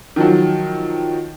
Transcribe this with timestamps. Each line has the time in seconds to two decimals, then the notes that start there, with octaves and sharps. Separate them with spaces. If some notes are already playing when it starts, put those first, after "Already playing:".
0.16 D#3 F3 F#3